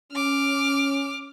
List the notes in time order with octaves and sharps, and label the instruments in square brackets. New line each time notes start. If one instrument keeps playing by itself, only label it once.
[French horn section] C#4 [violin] D6 F6